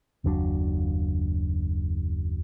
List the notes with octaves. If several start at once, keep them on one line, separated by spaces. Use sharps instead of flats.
F#1 D#2 F#3 D4